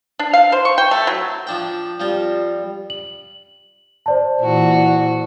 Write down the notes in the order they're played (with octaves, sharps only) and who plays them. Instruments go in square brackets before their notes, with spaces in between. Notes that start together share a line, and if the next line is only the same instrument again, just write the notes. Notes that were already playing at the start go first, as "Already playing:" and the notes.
[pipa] D4
F5
C5
C#6
G5
A3
F#3
[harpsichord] F3 D4 G5
[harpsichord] F3 C4 F4 [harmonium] G3
[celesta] F#7
C5 D5 A5
[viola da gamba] A#2 E3 F#4